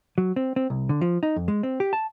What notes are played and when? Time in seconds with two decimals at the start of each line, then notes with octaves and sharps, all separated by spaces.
0.18 F#3
0.36 C4
0.56 C4
0.70 C2
0.89 D3
1.01 F3
1.23 D#4
1.36 F2
1.48 G#3
1.63 C4
1.80 G4
1.93 A5